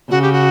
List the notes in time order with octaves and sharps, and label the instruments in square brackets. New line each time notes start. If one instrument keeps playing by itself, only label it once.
[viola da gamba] C#3 [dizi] F#4
[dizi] G4
F#4